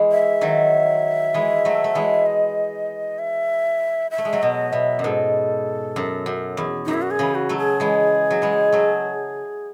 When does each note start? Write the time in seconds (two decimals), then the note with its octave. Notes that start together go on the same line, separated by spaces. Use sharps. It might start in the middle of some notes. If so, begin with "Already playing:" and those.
Already playing: E3 G#3
0.12 E5
0.41 D#3 F#3
1.34 E3 G#3
1.65 F#3 A3
1.84 A3
1.95 E3 G#3
2.26 D#5
3.19 E5
4.11 E5
4.18 A3
4.25 G#3
4.33 F#3 A3
4.42 B2 D#5
4.72 B2 E5
4.99 F#2
5.04 G#2 A4
5.96 F#2
6.26 F#2
6.57 E2
6.85 F#2 D#4
6.94 E4
7.02 F#4
7.11 G#4
7.19 C#3 E3
7.35 F#4
7.49 F#3 A3
7.57 G#4
7.80 E3 G#3
8.30 F#3
8.42 E3 G#3
8.72 F#3 A3